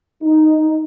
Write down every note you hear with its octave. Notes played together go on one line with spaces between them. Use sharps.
D#4